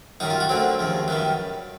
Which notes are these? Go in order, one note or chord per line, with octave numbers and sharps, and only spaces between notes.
F#2 D#3 G3 D#4
F4
F#4
D2 D3 F#3 C4
D#2 C#3 F3
F#2 D#3 G3 B3